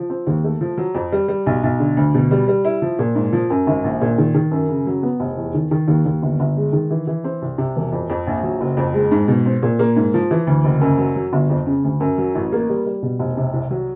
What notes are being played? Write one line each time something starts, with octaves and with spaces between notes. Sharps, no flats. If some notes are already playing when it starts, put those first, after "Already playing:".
Already playing: F3
C4
D#2
A3
F3
F#3
F2
G3
G3
B1
B1
D3
D2
B2
G3
G3
E4
F3
A#2
G#2
F3
F#2
G#1
A#1
A#2
D#3
D#3
F#2
C#3
F#3
B3
F1
E2
D#3
D#3
D#2
D#2
G1
G1
G#3
D#3
E3
E3
C4
C2
C3
E1
F2
F2
A#1
F#3
F#1
F2
G#3
G#2
B2
C4
A#2
A#3
G#2
F3
E3
D2
F#1
F#2
F#3
F#3
G1
F2
C#3
D2
F#2
F#3
A1
A#3
G3
G3
B2
F1
C3
C2
F#3